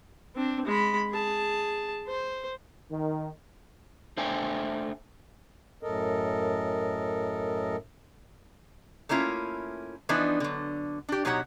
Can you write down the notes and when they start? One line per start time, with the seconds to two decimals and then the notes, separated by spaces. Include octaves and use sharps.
0.36 C4 D4
0.66 G#3 B5
1.10 G#4 A5
2.07 C5
2.91 D#3
4.17 A3 D4 C5 E5 G5 G#5
5.83 F#2 A2 A4 A#4 D#5
9.09 A3 A#3 C#4 E4 F4
10.09 E3 F3 B3 D4 D#4
10.40 D3 F#3
11.09 D4 G4
11.25 B2 F#3 D#4 G4 C#5 F#5